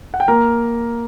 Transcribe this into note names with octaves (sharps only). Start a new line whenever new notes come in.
F#5
G5
A#3 A#4 A#5